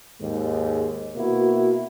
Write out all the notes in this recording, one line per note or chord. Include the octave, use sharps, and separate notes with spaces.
D#2 G#2 G#3
B2 A#3 E4 F#4